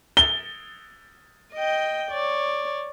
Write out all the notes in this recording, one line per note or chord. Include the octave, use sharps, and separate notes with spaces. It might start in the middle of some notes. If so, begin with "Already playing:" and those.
G7
D#5 G5
C#5 D5